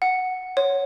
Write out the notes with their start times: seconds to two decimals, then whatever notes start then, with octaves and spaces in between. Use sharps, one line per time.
0.02 F#5
0.57 C#5